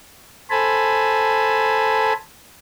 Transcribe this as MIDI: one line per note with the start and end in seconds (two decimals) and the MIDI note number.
0.50 2.13 69
0.50 2.13 72
0.50 2.13 80
0.50 2.13 81
0.50 2.13 83